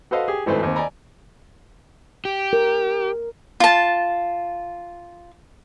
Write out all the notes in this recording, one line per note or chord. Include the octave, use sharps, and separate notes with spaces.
F#4 A4 B4 C5 D#5 F5
G4 G#4
G#1 D2 E3 A3 B4 C5
D#2 C4
D5 D#5 G#5 A#5 B5
G4
A#4
F4 A5